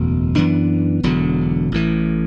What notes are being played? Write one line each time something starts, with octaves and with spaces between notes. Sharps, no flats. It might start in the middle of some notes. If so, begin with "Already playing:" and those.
Already playing: F#1 E2 B2 A3
F#2 E3 B3 D4
E1 E2 D3 F#3
A1 A2 E3